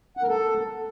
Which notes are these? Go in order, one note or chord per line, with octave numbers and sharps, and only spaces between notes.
F#5
A#4
A4